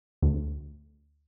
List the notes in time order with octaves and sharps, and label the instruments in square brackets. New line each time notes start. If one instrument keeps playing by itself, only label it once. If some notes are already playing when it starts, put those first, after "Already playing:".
[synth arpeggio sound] D2